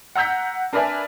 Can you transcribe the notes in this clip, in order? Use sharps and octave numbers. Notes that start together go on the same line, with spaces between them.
F#5 A#5 E6 G6 B6
D4 A#4 B4 D5 E5 G#5